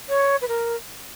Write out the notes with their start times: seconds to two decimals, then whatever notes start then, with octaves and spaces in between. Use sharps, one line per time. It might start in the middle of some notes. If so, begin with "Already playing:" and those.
0.09 C#5
0.42 B4
0.48 A#4